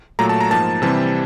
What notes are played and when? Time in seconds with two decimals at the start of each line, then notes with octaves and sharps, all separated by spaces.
0.19 A#2 F#3 A3 A#5
0.29 A5
0.41 A#5
0.50 G#2 F3 A#3 A5
0.82 C3 E3 G3 C4 A5